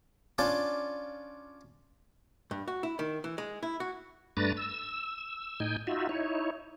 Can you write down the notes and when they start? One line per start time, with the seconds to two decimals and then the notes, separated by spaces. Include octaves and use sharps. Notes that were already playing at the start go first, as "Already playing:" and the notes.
0.38 C#4 D4 F4 C#5 D5
2.51 G2
2.68 F#4
2.83 E4
2.99 D#3
3.24 E3
3.38 G#3
3.63 E4
3.80 F#4
4.37 G2 A3 D4 B4 A#5 A6
4.57 E6
5.60 A2 D#4 G5 G#5
5.87 D#4 F4 F#4 E5
6.09 D#4 E4 C#5